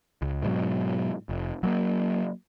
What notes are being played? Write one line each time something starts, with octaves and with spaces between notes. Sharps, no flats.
C#2
G#2 B2 E3 F#3
F1
F#3 A3 A#3